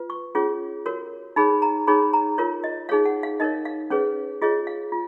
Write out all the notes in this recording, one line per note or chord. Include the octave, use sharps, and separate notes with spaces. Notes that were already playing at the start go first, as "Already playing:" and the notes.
Already playing: F4 B4
C#6
C#4 F4 G#4 C#5
F#4 A#4 C#5
D#4 G#4 C#5 B5
A#5
D#4 G#4 C#5 B5
A#5
F4 A#4 C#5
D#5
D#4 G#4 C#5 F5
F#5
F5
D#4 A#4 C#5 D#5
F5
C#4 G#4 B4 C#5
F4 G#4 C#5 D#5
F5
F4